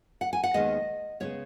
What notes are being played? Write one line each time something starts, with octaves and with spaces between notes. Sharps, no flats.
F#5
G#5
F#5
D#2 D#3 G#3 B3 D#5
C#3 G#3 B3 C#5